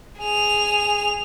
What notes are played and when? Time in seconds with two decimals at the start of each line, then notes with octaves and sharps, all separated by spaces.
0.19 G#4 F7